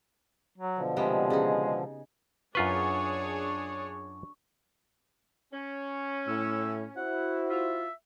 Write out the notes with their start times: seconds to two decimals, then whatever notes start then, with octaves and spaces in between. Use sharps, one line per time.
0.58 F#3
0.78 B2 D3 F3
0.96 C3 G3 G#3 B3
1.30 C#3 D#4
2.55 F#2 D4 F4 G#4 B4 C#5 C#6
5.52 C#4
6.28 A2 E6
6.97 E4 F#4 C5 F#5
7.50 F4 E5